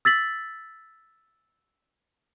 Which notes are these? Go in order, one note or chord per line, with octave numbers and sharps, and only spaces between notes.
E6 A6 B6 F#7